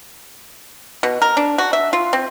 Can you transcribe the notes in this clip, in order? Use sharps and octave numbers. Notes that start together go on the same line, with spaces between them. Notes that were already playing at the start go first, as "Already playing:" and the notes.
B2
A#4
D4
F#4
E5
F4
C4